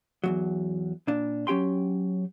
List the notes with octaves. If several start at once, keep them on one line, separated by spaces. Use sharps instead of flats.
E2 G#2 F#3
A#2 D4
F#3 C#4 G4 G5 C6